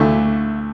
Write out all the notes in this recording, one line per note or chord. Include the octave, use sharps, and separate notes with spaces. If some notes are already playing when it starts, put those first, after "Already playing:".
Already playing: D2 D3 A3 E4